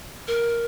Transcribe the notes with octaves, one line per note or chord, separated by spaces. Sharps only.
A#4